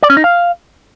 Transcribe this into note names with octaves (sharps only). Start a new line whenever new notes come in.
D5
C#4
D#4
F5